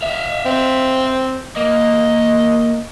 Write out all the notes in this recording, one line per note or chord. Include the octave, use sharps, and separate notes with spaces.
E5 F5
C4
A#3 D#5